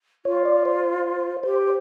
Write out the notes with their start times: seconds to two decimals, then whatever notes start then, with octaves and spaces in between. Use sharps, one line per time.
0.25 F4 C#5
0.45 D5
0.65 C5
1.43 G4 C5